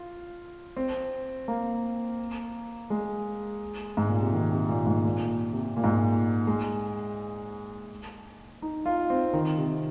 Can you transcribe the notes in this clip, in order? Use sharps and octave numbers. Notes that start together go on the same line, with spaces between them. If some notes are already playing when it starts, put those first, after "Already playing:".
Already playing: F4
C4
A#3
G#3
G#2
A#2
C3
D#3
C3
A#2
G#2
A#2
C3
A#2
G#2
A#2
G#3
D#4
F4
C4
D#3
C3